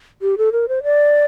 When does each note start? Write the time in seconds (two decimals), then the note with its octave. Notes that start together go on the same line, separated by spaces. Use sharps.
0.22 G4
0.38 A4
0.52 A#4
0.68 C5
0.83 D5